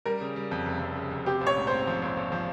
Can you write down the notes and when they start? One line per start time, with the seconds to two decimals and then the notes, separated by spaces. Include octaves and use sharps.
0.06 G3 A#4
0.21 C#3
0.36 G3
0.51 F2
0.66 F1
0.81 F2
0.96 C#3
1.11 F1
1.26 C4 G4
1.41 A#1
1.47 C#5
1.57 G#2
1.67 C4 C5
1.87 F3
2.02 A#1
2.17 A#1
2.32 F3